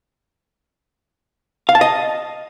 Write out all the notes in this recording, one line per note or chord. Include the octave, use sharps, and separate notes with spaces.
F5
A5
D#5